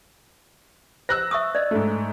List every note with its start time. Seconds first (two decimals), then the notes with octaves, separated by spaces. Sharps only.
1.09 C5 E6 F#6 A#6
1.31 E5 C#6 D#6
1.55 D5 D#5
1.71 G#2 A3